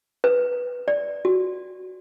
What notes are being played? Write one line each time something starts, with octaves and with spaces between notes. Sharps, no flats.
B4
D5
F#4